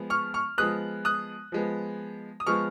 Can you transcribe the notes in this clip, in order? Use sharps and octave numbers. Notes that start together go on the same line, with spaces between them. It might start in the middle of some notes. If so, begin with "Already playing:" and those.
Already playing: F3 G#3 B3
C#6 F6
C#6 F6
F3 G#3 B3 D#6 F#6
D#6 F#6
F3 G#3 B3
D#6
F3 G#3 B3 C#6 F6